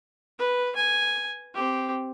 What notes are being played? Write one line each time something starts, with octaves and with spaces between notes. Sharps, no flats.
B4
G#5
C4 G4